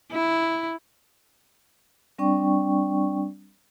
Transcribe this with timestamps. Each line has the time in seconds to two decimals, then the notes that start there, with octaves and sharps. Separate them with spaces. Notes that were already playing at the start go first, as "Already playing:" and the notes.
0.12 E4
2.18 G3 C4 D4 D5 G5 C#6